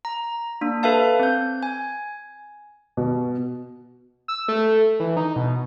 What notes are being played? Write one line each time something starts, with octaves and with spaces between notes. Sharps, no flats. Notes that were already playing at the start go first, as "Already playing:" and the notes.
A#5
A#3 D4
A4 B4 E5 F5 A5
C4 G6
G#5
B2
E6
A3
E3
D#4
B2